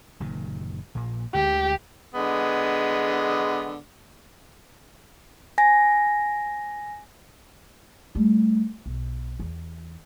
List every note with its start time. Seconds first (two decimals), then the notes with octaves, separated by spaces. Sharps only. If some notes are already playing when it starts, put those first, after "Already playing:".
0.20 F#1 A#2 D#3
0.95 A#1 A#2 A#3
1.34 D2 D3 G#3 G4
2.14 D3 G#3 B3
5.58 G#5 A#6
8.15 G3 A3
8.86 B1
9.40 E2